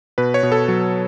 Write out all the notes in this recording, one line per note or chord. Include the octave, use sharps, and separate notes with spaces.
B2 B4
C#5
B2
A4
F#3